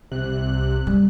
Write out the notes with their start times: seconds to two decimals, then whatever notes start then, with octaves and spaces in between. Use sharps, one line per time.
0.11 C2 C3 F#6
0.87 G3